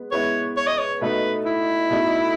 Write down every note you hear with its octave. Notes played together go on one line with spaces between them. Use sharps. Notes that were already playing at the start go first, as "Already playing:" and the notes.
Already playing: G#3 B3 B4
G#3 B3 E4 B4 C#5
C#5
D#5
C#5
B2 A3 D#4 A4 B4
E4
B2 A3 D#4 A4